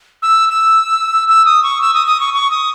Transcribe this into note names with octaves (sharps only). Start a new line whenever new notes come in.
E6
E6
E6
D#6
C#6
E6
D#6
D#6
C#6
C#6
D#6